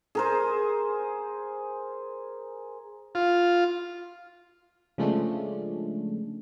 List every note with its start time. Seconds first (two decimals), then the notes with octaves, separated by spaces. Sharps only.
0.15 G#4 A#4 C5
3.15 F4
4.98 C#3 F3 G#3 A3 C#4 D4